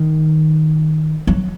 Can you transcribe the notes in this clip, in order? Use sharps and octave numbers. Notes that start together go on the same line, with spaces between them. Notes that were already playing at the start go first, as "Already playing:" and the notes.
Already playing: D#3
F#3